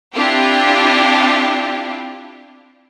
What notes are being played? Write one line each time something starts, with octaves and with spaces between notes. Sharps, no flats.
C4 D4 E4 F4 G4